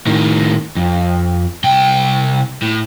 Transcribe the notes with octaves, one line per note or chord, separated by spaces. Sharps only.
A2 D#3
F2
C2 G5
A2